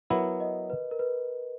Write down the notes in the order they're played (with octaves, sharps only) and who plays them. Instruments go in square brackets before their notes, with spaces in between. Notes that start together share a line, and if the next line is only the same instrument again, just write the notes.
[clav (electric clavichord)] F#3 B3 E4 [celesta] A#4
[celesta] D#5
B4
A#4
B4